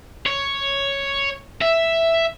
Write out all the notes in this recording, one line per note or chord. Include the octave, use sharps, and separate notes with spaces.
C#5
E5